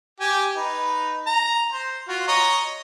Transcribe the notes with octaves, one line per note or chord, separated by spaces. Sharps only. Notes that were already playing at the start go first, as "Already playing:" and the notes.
G4 G#5
D#4 B4
A#5
C5
F4 F#4
C#5 D#5 A#5